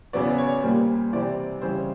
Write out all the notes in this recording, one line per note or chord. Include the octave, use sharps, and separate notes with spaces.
E2 C#3 F#3 B3 D5
C#5
A#2 G3 A#3 C5
C3 E3 G3 C4 D5
C#3 E3 G3 C4 C5